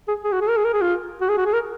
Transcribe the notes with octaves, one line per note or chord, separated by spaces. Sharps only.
G#4
G#4
F#4
G#4
A#4
G#4
A#4
G#4
F4
F#4
G#4
F#4
G#4
A#4